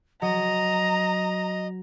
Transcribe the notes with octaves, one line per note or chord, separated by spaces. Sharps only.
F#3 D#5 A#5